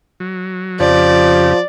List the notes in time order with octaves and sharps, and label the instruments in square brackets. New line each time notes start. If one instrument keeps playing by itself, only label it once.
[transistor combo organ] F#3
[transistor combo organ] F2 C#3 G4 [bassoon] F3 [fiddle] D5